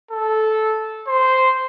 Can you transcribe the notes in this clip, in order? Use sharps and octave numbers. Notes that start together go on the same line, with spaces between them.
A4
C5